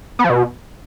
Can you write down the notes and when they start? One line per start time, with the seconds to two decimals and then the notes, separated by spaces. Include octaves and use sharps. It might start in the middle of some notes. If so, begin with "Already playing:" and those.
0.19 B3
0.24 F3
0.30 B2